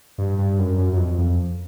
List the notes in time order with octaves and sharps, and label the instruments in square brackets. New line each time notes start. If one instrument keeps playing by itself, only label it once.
[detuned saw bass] G2
G2
F#2
F#2
F#2
F2
F2